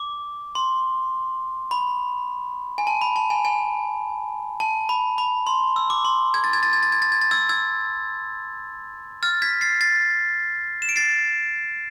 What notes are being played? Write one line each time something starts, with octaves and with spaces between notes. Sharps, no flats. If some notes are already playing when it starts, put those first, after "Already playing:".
Already playing: D6
C6
B5
G#5
A5
B5
A5
G#5
G#5
A5
B5
B5
C6
E6
D6
C6
G#6
A6
G#6
A6
G#6
A6
G#6
A6
G#6
A6
E6 G#6
E6 G#6
F6 A6
G#6 B6
A6 C7
A6 C7
E7
D7
A6 C7